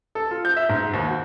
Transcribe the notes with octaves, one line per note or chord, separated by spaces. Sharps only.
A4
F4
G6
E5
G#2
D#2
F#4